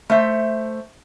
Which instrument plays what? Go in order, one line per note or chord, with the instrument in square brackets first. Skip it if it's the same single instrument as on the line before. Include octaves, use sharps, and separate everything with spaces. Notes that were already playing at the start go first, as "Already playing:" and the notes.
[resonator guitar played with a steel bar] A3 C5 E5